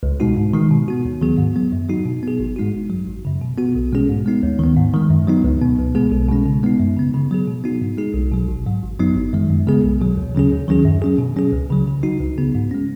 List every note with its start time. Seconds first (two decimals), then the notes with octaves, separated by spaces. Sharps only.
0.03 C#2
0.20 B2 G#3 D#4 F#4
0.36 G#2
0.53 D#3 G#3 D#4
0.71 B2
0.88 B3 F#4
1.05 D#2
1.21 D#3 F#3 B3 G#4
1.38 G#2
1.56 F#3 B3
1.72 F#2
1.89 F#3 D#4 F#4
2.06 B2
2.23 B3 G#4
2.40 G#1
2.56 G#2 G#3 D#4 F#4
2.74 G#1
2.90 F#2 F#3
3.08 G#1
3.25 F#2 C#3
3.41 B2
3.58 B3 F#4
3.75 B1
3.93 B2 G#3 C#4 G#4
4.09 G#2
4.26 G#3 B3 D#4
4.43 D#2
4.59 D#3 B3
4.77 G#2
4.94 D#3 G#3
5.10 F#2
5.27 F#3 B3 D#4
5.44 C#2
5.61 B2 B3
5.79 C#2
5.95 B2 G#3 B3 G#4
6.12 B1
6.28 B2 G#3 C#4
6.46 C#3
6.63 G#3 B3 D#4
6.79 F#2
6.96 C#3 B3
7.14 C#3
7.31 F#3 B3 G#4
7.48 B2
7.64 B3 D#4 F#4
7.82 G#2
7.98 G#3 D#4 G#4
8.14 B1
8.32 B2 F#3
8.48 G#1
8.66 G#2 F#3
8.82 G#1
8.99 F#2 F#3 B3 D#4
9.16 G#1
9.33 F#2 D#3 G#3
9.50 F#2
9.67 C#3 G#3 B3 G#4
9.84 B1
10.01 B2 F#3
10.17 D#2
10.35 C#3 F#3 C#4 G#4
10.51 D#2
10.68 D#3 F#3 C#4 G#4
10.85 F#2
11.02 F#3 C#4 G#4
11.19 B2
11.36 F#3 C#4 G#4
11.52 C#2
11.70 C#3 F#3
11.87 C#3
12.03 F#3 D#4 F#4
12.20 C#2
12.38 C#3 B3 G#4
12.55 G#2
12.71 G#3 C#4